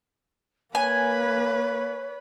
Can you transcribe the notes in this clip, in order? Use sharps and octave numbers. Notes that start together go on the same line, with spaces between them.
A#3 B4 C#5 G#5